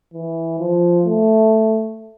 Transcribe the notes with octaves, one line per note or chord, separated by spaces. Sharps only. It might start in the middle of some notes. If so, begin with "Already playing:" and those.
E3
F3
A3